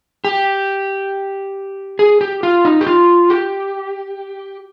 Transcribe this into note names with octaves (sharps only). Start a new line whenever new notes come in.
G4
G#4
G4
F4
D#4
G4
F4
G4